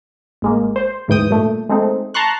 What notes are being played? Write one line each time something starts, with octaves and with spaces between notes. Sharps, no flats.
A1 G#3 A#3
C5
D2 G#2 E3 G5 D#6
G2 A#2 A3
G#3 A3 C4 D#4
A5 A#5 C6 C#6 F#6